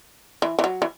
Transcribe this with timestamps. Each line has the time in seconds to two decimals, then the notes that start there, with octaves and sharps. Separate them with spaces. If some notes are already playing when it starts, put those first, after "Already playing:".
0.42 E3
0.59 E3
0.64 F#3
0.82 E3